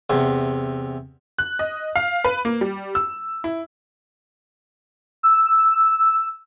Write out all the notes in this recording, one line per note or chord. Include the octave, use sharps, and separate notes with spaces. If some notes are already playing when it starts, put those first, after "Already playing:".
E2 C3
F#6
D#5
F5
B4
A#3
G3
E6
E4
E6